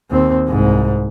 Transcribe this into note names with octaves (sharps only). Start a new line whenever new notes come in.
D#2 C4
C2 G#2